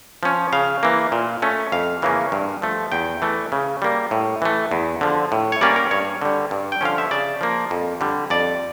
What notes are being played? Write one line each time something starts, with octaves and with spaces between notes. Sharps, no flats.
F3 C#4
C#3 F5
E3 A#3
A#2
A3 C#4
F2 F5
C#3 E3 A#3 C#4
G2
F3 A3
E2 G5
E3 A3
C#3
G3 A#3
A2
E3 A3
E2
D3 F3
A2
C#5
G3 A#3 C#4 D5
A#4
G2 C#5
D3 G3
G2
G5
D3 F3 C#4 F5
E5
C#3 D5
F3 A#3
F2
D3 G3
F2 D5